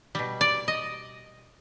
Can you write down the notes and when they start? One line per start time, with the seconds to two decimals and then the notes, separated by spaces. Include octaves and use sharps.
0.15 B2 G3
0.41 D5
0.68 D#5